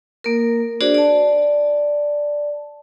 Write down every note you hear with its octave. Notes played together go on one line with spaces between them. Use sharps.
A#3 A#4
D4 F#4 G#4 C5 D5
D5 A5